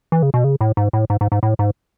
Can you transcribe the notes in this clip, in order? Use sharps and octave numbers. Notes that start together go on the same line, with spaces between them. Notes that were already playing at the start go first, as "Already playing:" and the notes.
E3
C#3
B2
C#3
A2
G#2
A2
G#2
G#2
G#2
A2
G#2